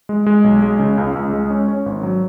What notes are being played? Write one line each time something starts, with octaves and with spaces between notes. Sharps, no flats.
G#3
G#3
B1
G#3
C#3
C#2
C#2
G#3
C#4
C#4
G#1
F#3